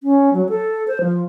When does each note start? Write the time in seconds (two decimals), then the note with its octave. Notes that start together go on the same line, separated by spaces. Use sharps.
0.03 C#4
0.33 F#3
0.49 A4
0.88 C5
1.01 F3